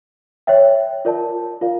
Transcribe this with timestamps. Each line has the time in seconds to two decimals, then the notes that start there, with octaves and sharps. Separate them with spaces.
0.47 C#5 E5 G5
1.05 F4 A#4 D5 A5
1.62 F4 A#4 D5 F5